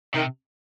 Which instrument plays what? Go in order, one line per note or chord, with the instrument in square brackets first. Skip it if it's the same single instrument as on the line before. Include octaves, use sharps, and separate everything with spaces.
[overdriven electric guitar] C3 [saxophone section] D#3